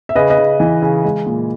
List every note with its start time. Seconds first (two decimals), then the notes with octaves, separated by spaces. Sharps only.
0.09 E5
0.15 C#3 B4 D#5
0.30 B4 D#5
0.38 C#3
0.60 E3
0.82 C#3
1.05 G#3
1.26 A#2